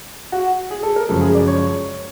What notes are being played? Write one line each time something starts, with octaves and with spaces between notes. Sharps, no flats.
F#4
G#4
A4
A#4
F#2 C#3 F3 G#3 A4
G#4
D5
C#5